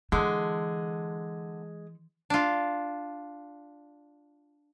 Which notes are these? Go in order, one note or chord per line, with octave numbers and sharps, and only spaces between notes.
D3 E3 G#3
D4 F4